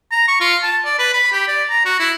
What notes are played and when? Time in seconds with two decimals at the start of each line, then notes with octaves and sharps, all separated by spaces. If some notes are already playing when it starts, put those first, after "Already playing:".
0.12 A#5
0.28 C#6
0.40 F4
0.63 A5
0.85 D5
0.99 B4
1.13 B5
1.33 G4
1.48 D5
1.70 A#5
1.85 F#4
2.00 E4